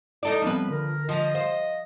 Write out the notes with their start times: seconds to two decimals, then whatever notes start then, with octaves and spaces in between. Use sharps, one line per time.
0.23 D#4 E4 A4 D5
0.42 F3 G3 B3 C4 B4
0.69 D3 A#4
1.09 F3 D#5
1.35 C5 F5